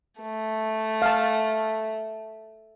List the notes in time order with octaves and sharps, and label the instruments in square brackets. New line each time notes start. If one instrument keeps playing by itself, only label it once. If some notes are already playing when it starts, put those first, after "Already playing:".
[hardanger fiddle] A3
[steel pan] F5 A5